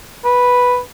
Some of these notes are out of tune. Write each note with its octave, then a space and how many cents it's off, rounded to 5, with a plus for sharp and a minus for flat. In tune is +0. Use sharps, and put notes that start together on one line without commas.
B4 -5